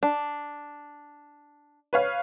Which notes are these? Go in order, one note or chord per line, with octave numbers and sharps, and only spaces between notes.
D4
B4 C#5 F5